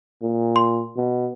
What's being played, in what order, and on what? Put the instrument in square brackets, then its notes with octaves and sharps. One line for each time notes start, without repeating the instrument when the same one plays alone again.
[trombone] A#2
[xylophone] C6
[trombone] B2